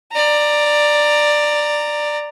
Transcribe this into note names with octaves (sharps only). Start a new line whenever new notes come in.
D5 A#5